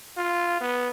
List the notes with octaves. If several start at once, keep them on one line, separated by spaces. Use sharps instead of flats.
F4
B3